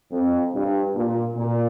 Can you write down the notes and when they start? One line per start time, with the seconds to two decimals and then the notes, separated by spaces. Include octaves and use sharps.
0.12 F2
0.54 G2
0.94 A#2
1.36 A#2